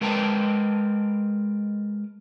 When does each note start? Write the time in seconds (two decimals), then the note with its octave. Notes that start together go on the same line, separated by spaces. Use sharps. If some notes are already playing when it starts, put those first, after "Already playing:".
0.01 G#3 A#4 B4 G5 A5 A#5